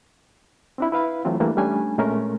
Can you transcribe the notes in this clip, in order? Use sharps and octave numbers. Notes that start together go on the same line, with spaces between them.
C4 D4 E4
E4 B4 F5 B5
E3 F#3 A3 C4 F4
E3 G3 A3 A#3 D4
G3 A3 C#4 D4 G#5
A#2 G#3 A3 C#4 A#4